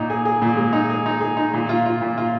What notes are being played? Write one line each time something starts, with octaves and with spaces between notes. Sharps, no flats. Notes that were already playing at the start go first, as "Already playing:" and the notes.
Already playing: A#2 D#4
G#4
G#4
A#2
G#3
D#4
G#4
D#4
G#4
D#4
A#2
F4
F4
A#2
F4